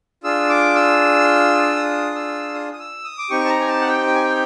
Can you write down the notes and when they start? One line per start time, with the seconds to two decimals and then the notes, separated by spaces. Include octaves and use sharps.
0.24 D4 F4 G#4 E6
0.49 D6
0.75 E6
1.76 D#6
2.15 E6
2.54 D#6
2.73 D#6
2.79 E6
3.04 D#6
3.18 D6
3.30 C4 D#4 G4 C#6
3.45 A5
3.50 A#5
3.60 G#5
3.68 A5
3.81 F#5
3.88 G5
4.07 G5
4.15 G#5
4.24 G5